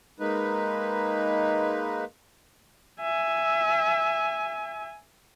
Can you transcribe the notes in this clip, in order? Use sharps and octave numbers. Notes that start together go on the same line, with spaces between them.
G#3 A#3 D#4 B4
E5 G#5